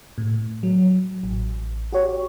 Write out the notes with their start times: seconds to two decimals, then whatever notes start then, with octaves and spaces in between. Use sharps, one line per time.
0.18 A2
0.63 F#3
1.23 A1
1.92 F#4 G4 C#5